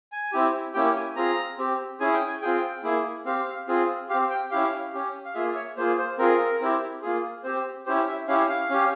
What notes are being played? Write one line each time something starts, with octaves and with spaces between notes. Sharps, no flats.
G#5
C4 E4 G4
A#3 C#4 E4 G4 G5
G#5
C4 F4 G#4 A#5
C4 G4
C#4 E4 G#4 G#5
G5
G#5
C4 F4 G#4 G5
A#3 E4 G#4
C4 G4 F5
C4 F4 G#4
C4 G4 F5
G5
C#4 E4 G4 F5
C#4 G4
F5
A#3 F4 G#4 E5
E5
C#5
A#3 F4 G#4 C5
C5
C4 F4 G#4 A#4
C4 E4 G4
A#3 F4 G#4
C4 G4 C5
C#4 E4 G4 C5
E5
C#4 E4 G4 F5
F5
C#4 G4